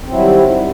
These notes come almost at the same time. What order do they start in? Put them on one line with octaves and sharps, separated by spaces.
C4 F#3 E4 G3 D#3